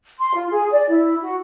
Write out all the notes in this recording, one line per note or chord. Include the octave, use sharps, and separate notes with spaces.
C6
F4
G#4
D5
E4
F#4